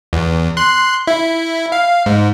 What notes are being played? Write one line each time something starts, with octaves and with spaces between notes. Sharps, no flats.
E2
C6 F#6
E4
F5
G#2